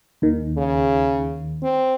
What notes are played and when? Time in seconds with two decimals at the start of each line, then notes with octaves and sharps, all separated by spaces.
0.22 D#2 D#3
0.57 C#3
1.63 C4